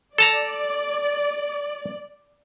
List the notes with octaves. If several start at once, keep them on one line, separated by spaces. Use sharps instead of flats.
A4 D5 A5 A#5